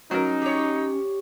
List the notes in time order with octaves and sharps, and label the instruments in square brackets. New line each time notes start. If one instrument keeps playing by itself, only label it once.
[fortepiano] F#3 A#4 [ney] C#4 [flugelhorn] D#4
[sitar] G4 C#5